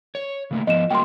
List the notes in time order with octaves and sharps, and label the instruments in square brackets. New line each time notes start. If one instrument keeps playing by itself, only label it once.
[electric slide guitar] C#5
C#3 A3 A#3
[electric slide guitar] F3 B3 [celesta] D#5 E7
[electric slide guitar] F#3 G3 A#3 [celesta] G5 C6